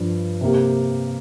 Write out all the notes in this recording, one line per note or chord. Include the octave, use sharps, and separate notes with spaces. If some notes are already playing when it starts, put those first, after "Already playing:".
Already playing: G2 F3 D4
C3 A#3 G4